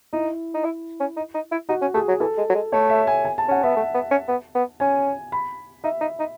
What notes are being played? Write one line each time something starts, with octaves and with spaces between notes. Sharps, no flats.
D#4 E4
D#4
E4
C#4
D#4
D#4
E4
D#4 F#4
C#4
A3 G#4
F#3
E3 A4
G#3
F#3
G#3
A3 C#5
E5
G#5
G#5
A5
C#4 F#5
B3 E5
A3
B3
C#4
B3
B3
C#4 G#5
B5
D#4 E5
D#4
D#4